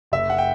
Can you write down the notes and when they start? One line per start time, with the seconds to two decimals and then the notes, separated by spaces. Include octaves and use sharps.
0.12 F#1 E5
0.30 F#5
0.38 G5